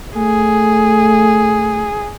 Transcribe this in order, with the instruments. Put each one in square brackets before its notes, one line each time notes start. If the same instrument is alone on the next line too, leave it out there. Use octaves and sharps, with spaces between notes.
[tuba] A3 [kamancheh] G#4